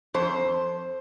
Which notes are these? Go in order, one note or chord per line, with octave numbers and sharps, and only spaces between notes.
F2 C5